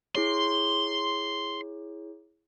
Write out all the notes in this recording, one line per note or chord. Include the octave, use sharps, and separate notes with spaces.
E4 G#4 C#5 C6